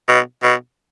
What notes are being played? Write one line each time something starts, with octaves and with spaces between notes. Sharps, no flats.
B2
B2